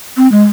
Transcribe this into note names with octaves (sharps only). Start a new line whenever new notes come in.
C4
G#3